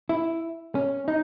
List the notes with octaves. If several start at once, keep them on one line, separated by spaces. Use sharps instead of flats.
E4
C#4
D#4